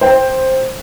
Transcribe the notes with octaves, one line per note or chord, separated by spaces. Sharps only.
C5 G5